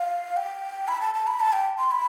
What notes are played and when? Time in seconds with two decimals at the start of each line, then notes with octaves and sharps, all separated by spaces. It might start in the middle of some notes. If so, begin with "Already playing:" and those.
Already playing: F5
0.37 G5
0.88 B5
1.01 A5
1.14 A5
1.27 B5
1.40 A5
1.53 G5
1.78 C6
1.91 B5